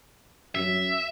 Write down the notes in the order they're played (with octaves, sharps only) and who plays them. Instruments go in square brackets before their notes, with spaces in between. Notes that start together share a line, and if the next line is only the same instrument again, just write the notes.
[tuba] F#2 [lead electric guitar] E5